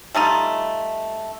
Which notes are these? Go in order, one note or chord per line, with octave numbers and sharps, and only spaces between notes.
G3 A3 D#4 F4